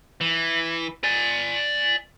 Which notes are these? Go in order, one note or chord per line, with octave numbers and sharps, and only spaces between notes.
E3
D5 G#5